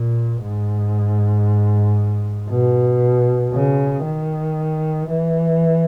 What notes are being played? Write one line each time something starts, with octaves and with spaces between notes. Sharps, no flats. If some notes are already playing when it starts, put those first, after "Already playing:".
Already playing: A#2
G#2
B2
C#3
D#3
E3